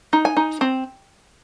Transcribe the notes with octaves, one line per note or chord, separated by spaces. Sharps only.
D#4
G#5
D#4
C4